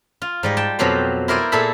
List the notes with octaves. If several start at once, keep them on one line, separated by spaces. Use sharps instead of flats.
F4
G#2 G3 D#5
G5 A5
F2 B2 F3 F#3 G4 C5
E4 A#4 C5 D5 G#5
A#2 E4 G#4 A4 E5 B5